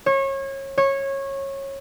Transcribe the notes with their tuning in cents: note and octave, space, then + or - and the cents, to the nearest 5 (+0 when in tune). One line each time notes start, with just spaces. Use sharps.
C#5 -30
C#5 -20